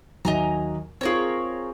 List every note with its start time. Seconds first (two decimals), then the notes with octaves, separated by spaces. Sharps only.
0.25 D#2 F#3 D#5 G#5 A#5
1.01 C4 F4 G#4 A#4 C#5